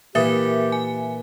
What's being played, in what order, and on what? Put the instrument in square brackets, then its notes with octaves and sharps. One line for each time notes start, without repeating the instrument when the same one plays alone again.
[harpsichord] A#2 E3 [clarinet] G4 [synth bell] A#4 E5
[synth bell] G#5